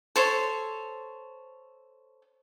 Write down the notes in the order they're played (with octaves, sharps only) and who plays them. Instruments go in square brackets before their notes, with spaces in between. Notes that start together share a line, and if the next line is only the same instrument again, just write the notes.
[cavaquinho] A4 C5 C#5